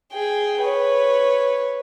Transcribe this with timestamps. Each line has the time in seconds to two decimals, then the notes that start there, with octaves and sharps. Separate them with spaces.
0.12 G#4 G5
0.60 B4 C#5